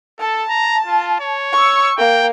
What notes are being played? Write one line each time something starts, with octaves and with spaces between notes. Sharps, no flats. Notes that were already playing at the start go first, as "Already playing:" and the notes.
A4 A5
A#5
F4
C#5
C#6 E6
A#3 G5